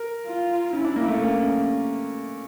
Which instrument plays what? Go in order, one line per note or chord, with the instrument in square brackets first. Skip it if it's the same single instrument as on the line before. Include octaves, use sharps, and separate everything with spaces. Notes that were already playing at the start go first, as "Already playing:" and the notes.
Already playing: [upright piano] A#4
[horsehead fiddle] F4
[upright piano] C#4 [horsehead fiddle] E4
[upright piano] D4
A#3
A3
[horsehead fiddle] A#3 [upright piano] C#4
[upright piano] C#4